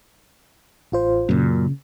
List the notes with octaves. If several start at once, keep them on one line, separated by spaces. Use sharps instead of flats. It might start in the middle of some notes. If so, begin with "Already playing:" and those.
A1 F4 C5
F#2 A#2 C#3